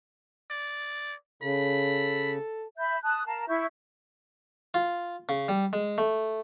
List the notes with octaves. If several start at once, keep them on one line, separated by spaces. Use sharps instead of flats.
D5
C#3 A4 B5
E5 B5 G6
A5 D#6 F#6
A#4 F5 A5 A#5
E4 E5 C#6 G6
F4
C#3
G3
G#3
A3